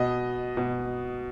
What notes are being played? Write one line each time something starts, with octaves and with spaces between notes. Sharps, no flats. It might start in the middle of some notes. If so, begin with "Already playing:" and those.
Already playing: B2 D#5
B2